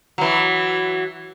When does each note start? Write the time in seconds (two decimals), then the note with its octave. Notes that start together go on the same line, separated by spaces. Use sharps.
0.18 E3 F#3